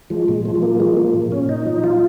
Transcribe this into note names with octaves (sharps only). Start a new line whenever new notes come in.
F3 G#3
A#2 G#3
F3 G#3
G#3
F3 A#3
F3 G#3
F3 A#3
A#2
A#2 C#4
A#2 D#4
F3
F3 F4